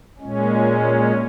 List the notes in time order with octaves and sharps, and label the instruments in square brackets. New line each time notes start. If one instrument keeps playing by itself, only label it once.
[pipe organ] A#2 G#3 C#4